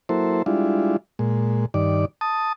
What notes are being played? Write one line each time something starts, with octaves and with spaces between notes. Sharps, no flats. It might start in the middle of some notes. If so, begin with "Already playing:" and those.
F#3 A#3 E4 A4 C5
G3 G#3 D4 E4 F4
A#2 G#3
G2 D#3 D5
A5 D#6